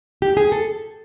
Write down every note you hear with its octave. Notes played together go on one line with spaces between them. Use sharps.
G4
G#4
A4